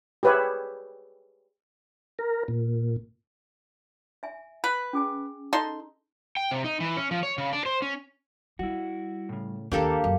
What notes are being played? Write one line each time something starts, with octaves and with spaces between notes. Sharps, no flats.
G4 G#4 B4 C#5 E5
A#4
A#2
E5 G#5
B4
C#4 G#4 G#5
D#4 A4 C6
G5
C3
D#4
E3
C#4
F3
C#5
C#3
D4
C5
C#4
G3 E4 F#4
A2 C#3
D#2 A#3 D4 G4 A4
F#2